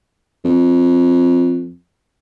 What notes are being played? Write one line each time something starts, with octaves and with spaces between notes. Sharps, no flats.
F2